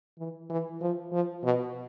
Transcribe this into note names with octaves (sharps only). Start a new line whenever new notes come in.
E3
E3
F3
F3
B2